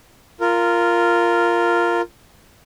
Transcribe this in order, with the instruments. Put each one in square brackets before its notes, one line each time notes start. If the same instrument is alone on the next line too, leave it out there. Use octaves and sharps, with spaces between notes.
[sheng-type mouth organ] F4 A#4